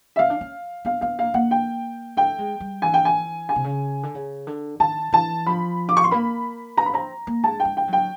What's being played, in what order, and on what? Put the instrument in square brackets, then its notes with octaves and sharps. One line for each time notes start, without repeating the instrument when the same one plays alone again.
[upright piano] E5
[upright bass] C#4 [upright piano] F5
[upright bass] D4
C#4
[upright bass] B3 [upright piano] F5
[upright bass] B3 [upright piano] F5
[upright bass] A#3 [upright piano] F5
[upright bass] A#3 [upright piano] F#5
[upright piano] G5
[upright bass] A3 [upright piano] G5
[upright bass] G#3
G3
[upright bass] E3 [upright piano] G#5
[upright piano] G5
G#5
[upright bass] C#3 [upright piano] G#5
[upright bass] C3
C#3
D3
C#3
D3
[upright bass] D#3 [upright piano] A5
[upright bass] E3 [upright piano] A5
[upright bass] F3 [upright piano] B5
[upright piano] D6
C#6
C6
[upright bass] A#3 [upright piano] B5
[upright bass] B3 [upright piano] A#5
[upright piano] B5
[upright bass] C4 [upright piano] A#5
[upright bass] A#3
[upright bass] G#3 [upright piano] A5
[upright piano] G5
[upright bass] G#3
[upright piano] G5
[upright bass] F#3
[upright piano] G5